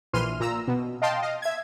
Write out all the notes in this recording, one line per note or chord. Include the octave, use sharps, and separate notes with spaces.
A#1 E3 C6 F6 D#7
A#2 A#5 E6
B2
D#5 F5 G5 A5 C6
D#5 F5
E5 G#6